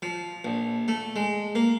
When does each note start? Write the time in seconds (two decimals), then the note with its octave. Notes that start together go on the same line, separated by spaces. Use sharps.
0.02 F3
0.45 A#1
0.88 A3
1.16 G#3
1.55 A#3